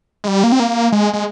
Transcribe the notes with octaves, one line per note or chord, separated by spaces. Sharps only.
G#3
G3
A#3
C4
A#3
G#3
G#3